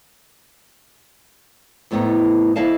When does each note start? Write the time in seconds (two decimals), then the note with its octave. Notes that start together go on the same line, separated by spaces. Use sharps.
1.91 F2 A2 A3 B3 D#4
2.56 F2 E4 A4 D#5 F5 A5